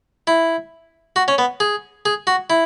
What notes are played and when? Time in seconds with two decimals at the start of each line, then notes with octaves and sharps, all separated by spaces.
0.27 E4
1.16 F#4
1.28 C#4
1.38 B3
1.60 G#4
2.05 G#4
2.27 F#4
2.50 E4